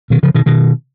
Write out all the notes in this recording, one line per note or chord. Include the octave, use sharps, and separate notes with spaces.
B2 D#3
C#3 F3
B2 D#3
B2 D#3